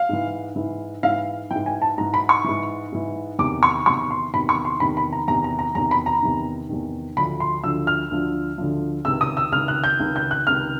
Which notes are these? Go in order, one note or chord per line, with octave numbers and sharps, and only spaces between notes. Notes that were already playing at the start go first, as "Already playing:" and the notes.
Already playing: F5
G#2 E3
G#2 E3
G#2 E3 F5
G#2 E3 G5
G#5
A5
G#2 E3 A#5
B5
C#6
G#2 E3
G#2 E3
E2 C3 D#3 D6
C#6
E2 C3 D#3 C#6
C6
E2 C3 D#3 B5
C#6
C6
E2 C3 D#3 B5
B5
A#5
E2 C3 D#3 A#5
A#5
A#5
E2 C3 D#3 A#5
B5
A#5
E2 C3 D#3
E2 C3 D#3
D2 D3 F3 B5
C6
D2 D3 F3 E6
F6
D2 D3 F3
D2 D3 F3
C#2 C3 D#3 E6
D#6
E6
C#2 C3 D#3 F6
F#6
G6
C#2 C3 D#3
G6
F#6
C#2 C3 D#3 F6